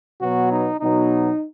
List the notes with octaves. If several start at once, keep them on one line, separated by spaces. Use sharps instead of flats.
B2 F#3 B3 F#4
D#4
B2 F#3 B3 D#4